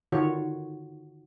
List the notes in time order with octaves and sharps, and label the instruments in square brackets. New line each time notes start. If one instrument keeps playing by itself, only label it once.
[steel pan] D3 D#3 F4 F#4 C#5